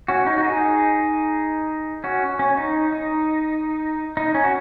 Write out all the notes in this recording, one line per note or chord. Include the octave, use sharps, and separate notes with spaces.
C#4 F#4
D#4
F#4
D#4 G#4
C#4 F#4
C#4
D#4
D#4
D#4
C#4
F#4